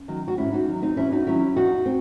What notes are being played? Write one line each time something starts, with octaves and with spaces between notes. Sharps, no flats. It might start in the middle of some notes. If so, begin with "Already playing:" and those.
Already playing: C#4
D#3 F#3
F#4
G#2 C#4 E4
D#4 F#4
D#3 F#3
C4 D#4
E2 C#4 E4
D#4 F#4
D#3 F#3 C#4 E4
E2 D#4 F#4
C4